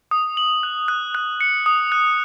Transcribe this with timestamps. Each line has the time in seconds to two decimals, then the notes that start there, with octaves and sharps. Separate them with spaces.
0.11 D#6
0.37 F#7
0.63 F#6
0.88 F#6
1.15 F#6
1.41 C#7
1.66 D#6
1.92 F#6